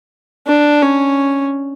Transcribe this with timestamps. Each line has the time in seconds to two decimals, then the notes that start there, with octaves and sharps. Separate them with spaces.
0.47 D4
0.82 C#4